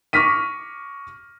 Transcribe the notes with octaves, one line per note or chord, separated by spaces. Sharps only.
C#6 D6 F6 A#6 B6 D#7